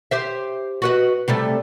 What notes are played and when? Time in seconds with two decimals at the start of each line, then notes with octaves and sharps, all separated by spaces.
0.11 G4 C5 E5
0.82 F#4 B4 D#5
1.28 C3 G3 A3